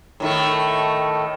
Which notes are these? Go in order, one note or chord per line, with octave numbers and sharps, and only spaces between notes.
A2 D#3 A3